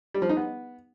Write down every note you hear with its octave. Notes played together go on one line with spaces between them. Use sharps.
G3
F3
D#4
B3